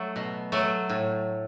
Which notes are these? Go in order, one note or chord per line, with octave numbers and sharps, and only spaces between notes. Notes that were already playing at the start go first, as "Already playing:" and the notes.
Already playing: F#3 A3
B2
F#3 A3
A2